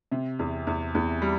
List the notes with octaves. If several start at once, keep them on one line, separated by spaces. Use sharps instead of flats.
C3
E2
E2
E2
G3